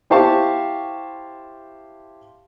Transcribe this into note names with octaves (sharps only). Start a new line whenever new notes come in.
E4 G4 C5 F5 A5 C#6